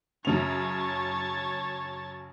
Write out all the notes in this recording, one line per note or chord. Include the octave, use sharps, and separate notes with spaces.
F#2 C#3 C#5 A5 F7